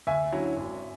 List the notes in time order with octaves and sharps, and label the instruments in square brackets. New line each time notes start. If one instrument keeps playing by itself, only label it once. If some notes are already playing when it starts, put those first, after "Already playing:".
[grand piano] D2 [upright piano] E5 G#5
[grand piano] D3 F#3 C#4 E4
G#1